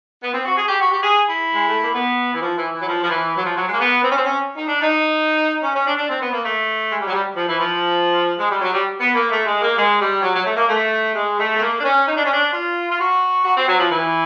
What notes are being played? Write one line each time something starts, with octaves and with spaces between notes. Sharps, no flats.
B3
C4
F#4
G#4
G4
F#4
G4
G#4
E4
G#3
A3
A#3
B3
E3
F3
E3
E3
F#3
F3
F3
E3
F#3
F3
F#3
G#3
A#3
B3
C4
C#4
C4
C#4
D#4
D4
D#4
C#4
C#4
D4
D4
C4
B3
A#3
A3
G#3
G3
F#3
G3
F3
E3
F3
G#3
G3
F#3
G3
B3
A#3
A3
G#3
A#3
G#3
G3
F#3
F#3
A3
A#3
A3
G#3
A3
A3
A#3
D4
C#4
D#4
D4
C#4
D4
F4
F4
F#4
F#4
C4
F#3
F3
E3